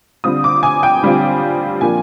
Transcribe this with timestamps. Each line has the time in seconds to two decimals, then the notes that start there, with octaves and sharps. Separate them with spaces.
0.24 D3 G3 C4 F4 D#6
0.44 D6
0.63 G#5
0.83 G5
1.03 D3 G3 C4 F4
1.81 A#2 F3 A#3 D4 F4 G#5